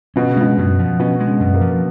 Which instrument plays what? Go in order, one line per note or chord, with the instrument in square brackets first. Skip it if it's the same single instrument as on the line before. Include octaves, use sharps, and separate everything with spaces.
[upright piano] B2 [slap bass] C#4
[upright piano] C#3
[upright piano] B2 [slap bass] G#3
[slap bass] F#2
F3
[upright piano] B2 [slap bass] C#4
[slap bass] G#3
[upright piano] C#3
[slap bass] F#2
[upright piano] A#3
[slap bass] F3